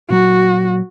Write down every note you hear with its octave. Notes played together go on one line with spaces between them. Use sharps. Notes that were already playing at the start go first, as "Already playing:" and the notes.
A#2 F#3 F#4